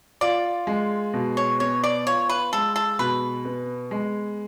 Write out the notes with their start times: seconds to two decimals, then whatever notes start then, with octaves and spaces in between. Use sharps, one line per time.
0.21 F4 D5
0.67 G#3
1.14 B2
1.37 C#5
1.60 B3 C#5
1.84 D5
2.06 F4 C#5
2.29 B4
2.53 G#3 A4
2.76 A4
2.99 B2 B4
3.45 B3
3.91 G#3